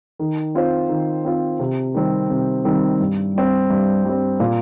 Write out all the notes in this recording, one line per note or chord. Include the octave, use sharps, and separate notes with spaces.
D#3
C4 F4 C5
D#3
C4 F4 C5
C3
D#3 G3 C4
C3
D#3 G3 C4
G2
G3 C4
G2
G3 C4
A#2